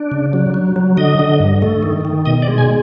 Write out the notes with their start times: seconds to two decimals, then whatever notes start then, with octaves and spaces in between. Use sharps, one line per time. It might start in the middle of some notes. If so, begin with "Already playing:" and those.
Already playing: D4
0.11 C#3
0.33 F#3
0.54 F#3
0.76 F#3
0.97 D3 D#5
1.19 D3
1.40 G2
1.62 A3
1.83 D#3
2.05 D#3
2.26 B2 D#5
2.42 D5
2.48 G#3
2.58 G#5